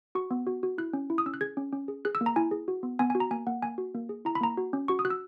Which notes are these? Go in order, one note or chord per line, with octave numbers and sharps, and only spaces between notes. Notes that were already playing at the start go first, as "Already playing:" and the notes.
F#4 C#6
B3
F#4
F#4
E4 F#6
C#4
E4
D#6
C#4 E6
F#6
G#4 G#6
C#4
C#4
G#4
G#4 F#6
E6
A#3
A#5
E4 G#5
G#4
F#4
B3
B3 G#5
G#5
F#4
A#5
A#3 G#5
A#3 F#5
A#3 G#5
F#4
A#3
G#4
E4 A#5
B5
A#3 A#5
F#4
C#4
F#4 C#6
D#6
F#4 F#6
E6